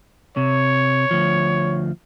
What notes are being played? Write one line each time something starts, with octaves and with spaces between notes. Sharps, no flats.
C3 C#5
D2 F3